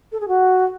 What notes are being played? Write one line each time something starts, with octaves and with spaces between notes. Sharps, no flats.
A4
G#4
F#4